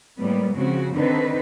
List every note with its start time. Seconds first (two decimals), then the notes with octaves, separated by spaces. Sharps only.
0.20 A2 G3 G#3 A#3 B3
0.55 C#3 F3 C4 F#4
0.94 D3 D#3 C4 D#4 B4